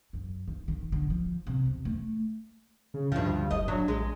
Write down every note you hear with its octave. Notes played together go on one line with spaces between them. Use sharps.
F#2
D#3
D#3
D3
F3
C3
E2
A3
C#3
D2 G2 F3
F#1 D#5
F#3 D4
A#1 G#3